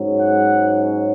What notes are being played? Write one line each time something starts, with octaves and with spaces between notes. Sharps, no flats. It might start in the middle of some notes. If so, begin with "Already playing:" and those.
Already playing: G#2 F#3 C#4
F#5